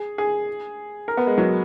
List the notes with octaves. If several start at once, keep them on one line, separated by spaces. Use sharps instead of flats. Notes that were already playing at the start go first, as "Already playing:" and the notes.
Already playing: G#4
G#4
A#4
B3
G#3
F#3